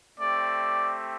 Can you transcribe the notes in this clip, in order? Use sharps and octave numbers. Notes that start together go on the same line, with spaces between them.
A3 C4 G4 D5